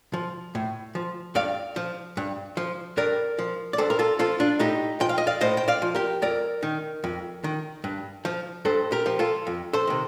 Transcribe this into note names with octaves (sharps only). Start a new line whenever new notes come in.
F3
A2
F3
G2 D5 F5
F3
G2
F3
G2 A#4 D5
F3
D5
G2 A4 C5
A#4
F4 A4
F3 F4 A4
D4 F4
A2 D#4 G4
F3 G5
F5
D#5
D5 F5
A2 C5 D#5
G5
D5 F5
F3
G4 A#4
F2 A#4 D5
D#3
F2
D#3
G2
F3
G2 A4 C5
G4 A#4
F3
F4 A4
F2
A4 C5
C3 D#3